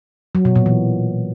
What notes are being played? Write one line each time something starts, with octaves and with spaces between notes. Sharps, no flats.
F#3
B2
A#2
E3